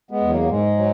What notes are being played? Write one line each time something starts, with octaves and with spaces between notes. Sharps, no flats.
G#3 B3
E2
F#3 A#3
F#3
G#2 G#3
F#3